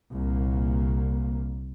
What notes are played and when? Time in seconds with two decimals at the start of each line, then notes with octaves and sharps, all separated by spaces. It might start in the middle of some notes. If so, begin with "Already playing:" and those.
0.14 C2 A#2 A#3